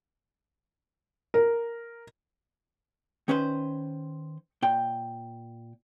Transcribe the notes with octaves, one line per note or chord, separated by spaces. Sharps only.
A#4
D#3 C#4 B4 C5
A#2 G5